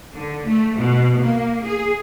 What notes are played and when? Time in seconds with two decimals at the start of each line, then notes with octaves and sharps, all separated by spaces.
0.15 D3
0.45 A3
0.76 B2
1.21 A#3
1.63 G#4